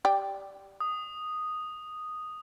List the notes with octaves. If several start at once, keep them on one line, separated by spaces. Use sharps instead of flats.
G4 D5 G5
D#6